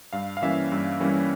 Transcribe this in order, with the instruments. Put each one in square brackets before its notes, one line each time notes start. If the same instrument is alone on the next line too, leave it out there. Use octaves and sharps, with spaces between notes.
[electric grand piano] G2 F5
F5
E3 G3 A#3 C#4 E5
G2
E3 G3 A#3 C#4